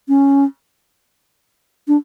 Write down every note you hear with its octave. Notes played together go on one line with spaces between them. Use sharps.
C#4
D4